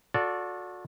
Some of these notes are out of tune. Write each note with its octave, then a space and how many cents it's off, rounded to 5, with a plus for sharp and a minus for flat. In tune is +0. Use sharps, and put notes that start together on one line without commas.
F#4 -35 A4 +0 D5 -15